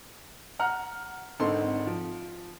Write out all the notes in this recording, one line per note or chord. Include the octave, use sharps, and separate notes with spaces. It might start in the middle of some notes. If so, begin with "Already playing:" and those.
F#5 A#5 F6
G#1 D3 C4 D#4 A4 C6
F3